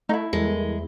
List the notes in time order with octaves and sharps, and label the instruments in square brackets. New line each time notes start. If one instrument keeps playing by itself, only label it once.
[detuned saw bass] A3 [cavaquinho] D#4 E4
[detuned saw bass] E2 [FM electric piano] G3 A4 A#4 [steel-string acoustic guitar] G#3